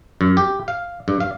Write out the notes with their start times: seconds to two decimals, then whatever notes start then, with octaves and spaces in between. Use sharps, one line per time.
0.21 F#2
0.37 G4
0.68 F5
1.08 G2
1.20 F5